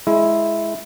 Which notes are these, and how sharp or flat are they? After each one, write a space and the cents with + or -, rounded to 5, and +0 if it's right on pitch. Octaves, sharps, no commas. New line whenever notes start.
G#3 +15 E4 +0 A#5 +40